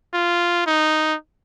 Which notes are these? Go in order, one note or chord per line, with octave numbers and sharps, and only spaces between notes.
F4
D#4